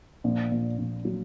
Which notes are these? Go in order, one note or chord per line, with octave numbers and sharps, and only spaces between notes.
A#1
A#2
A#1
F#3